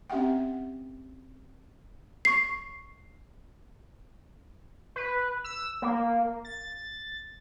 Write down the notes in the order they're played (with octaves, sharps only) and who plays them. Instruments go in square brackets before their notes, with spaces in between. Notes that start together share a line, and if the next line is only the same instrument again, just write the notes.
[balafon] C4 C#4 G4 E5 F#5 G5
[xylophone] C#6 C7
[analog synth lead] B4
E6
A#3
A6